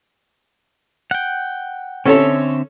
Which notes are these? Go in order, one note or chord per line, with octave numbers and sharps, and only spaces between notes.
F#5 G5
D3 C4 C#4 A4 C#5 E5